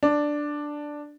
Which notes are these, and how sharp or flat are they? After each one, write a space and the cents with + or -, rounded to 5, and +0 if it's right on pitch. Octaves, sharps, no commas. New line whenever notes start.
D4 +5